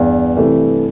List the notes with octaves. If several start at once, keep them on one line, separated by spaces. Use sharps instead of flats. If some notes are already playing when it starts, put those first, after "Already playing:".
Already playing: E2 G2
C3 E3 A3